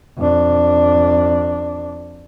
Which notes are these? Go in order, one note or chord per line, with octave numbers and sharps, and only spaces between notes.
F2 D4